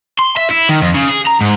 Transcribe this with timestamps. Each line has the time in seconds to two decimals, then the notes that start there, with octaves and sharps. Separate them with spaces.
0.19 C6
0.37 E5
0.50 E4
0.69 D#3
0.81 F2
0.95 C#3
1.09 G#4
1.27 A#5
1.41 G#2